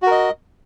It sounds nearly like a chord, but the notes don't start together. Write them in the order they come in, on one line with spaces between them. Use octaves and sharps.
F#4 A#4 D#5